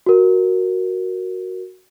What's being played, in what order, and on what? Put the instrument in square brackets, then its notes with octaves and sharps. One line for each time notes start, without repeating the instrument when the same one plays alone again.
[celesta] F#4 A#4